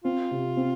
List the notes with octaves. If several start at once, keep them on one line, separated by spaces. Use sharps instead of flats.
C4 F4
C3
C4